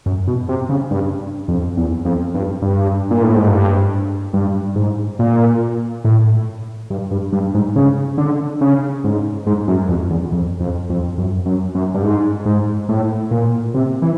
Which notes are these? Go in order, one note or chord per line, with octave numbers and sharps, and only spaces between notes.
F#2
B2
C3
C#3
G2
F2
E2
F2
G2
G2
A#2
A2
G#2
G2
G2
G#2
A#2
A2
G2
G2
G2
G#2
C#3
D3
C#3
G#2
G#2
F#2
F2
E2
F2
F2
F2
F#2
F#2
F#2
G2
G#2
G#2
A2
A#2
C3
E3